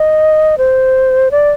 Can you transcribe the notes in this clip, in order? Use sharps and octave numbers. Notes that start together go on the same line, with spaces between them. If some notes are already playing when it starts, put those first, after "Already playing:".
Already playing: D#5
C5
D5